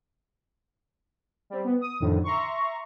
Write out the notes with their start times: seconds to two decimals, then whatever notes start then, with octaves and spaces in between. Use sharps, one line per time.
1.50 G3 C4
1.65 B3
1.81 D#6
2.00 F2 A2 D3 D#3
2.24 E5 A#5 C6 C#6